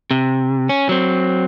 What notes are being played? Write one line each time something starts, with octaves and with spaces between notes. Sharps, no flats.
C3
C#4
F#3 C4